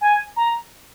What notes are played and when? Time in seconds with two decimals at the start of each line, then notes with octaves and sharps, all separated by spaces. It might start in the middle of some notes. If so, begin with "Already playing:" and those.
0.01 G#5
0.36 A#5